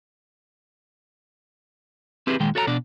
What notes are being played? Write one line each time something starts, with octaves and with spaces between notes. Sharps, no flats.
C4 E4 G4 G#4 B4
A#2 D#3 G#3 G5
F#4 A4 C#5 E5 A#5
B2 D4 D5